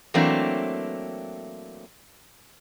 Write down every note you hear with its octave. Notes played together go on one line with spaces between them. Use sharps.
E3 F#3 A3 A#3 C4 D4